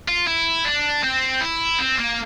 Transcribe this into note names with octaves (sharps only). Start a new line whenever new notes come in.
F4
E4
D4
C4
E4
C4
A#3